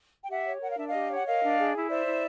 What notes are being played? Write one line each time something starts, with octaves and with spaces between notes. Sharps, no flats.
G5
G4 E5 F#5
C#5
A#4 F#5
F5
D4 E5
D#5 F5
G4
C#5
F#5
A#4 D#5 F5
D4
G#4
E4
C5 D5 E5
E4